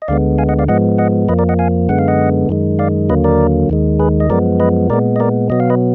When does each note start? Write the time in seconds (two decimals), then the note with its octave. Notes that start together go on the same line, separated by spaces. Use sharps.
0.02 D#5
0.08 D2 D3 G#3 B3 D5 F5
0.38 F5 G#5
0.49 D#5 F#5
0.59 D5 F5
0.68 G#2 F3 G#3 B3 D#5 F#5
0.98 D#5 F#5
1.29 F2 F3 A#3 B4 D#5
1.39 A#4 D5
1.49 D#5 F#5
1.59 F5 G#5
1.89 F#2 D3 G#3 B3 F#5
1.99 F5
2.08 D#5 F#5
2.49 F#2 D#3 G#3
2.79 D5 F5
3.09 D#2 D3 F#3 A#3 B4 D#5
3.24 A#4 D5
3.70 D#2 D#3 G#3
3.99 G#4 B4
4.20 D#5
4.30 F#2 F3 G#3 B3 A#4 D5
4.60 B4 D#5
4.90 A#2 G#3 B3 A#4 D5
5.16 D#5
5.20 A#4 D5
5.50 B2 F#3 B3 D#5
5.60 F5
5.70 B4 D#5